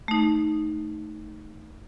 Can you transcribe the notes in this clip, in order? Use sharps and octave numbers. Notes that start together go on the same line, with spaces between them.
A3 D#4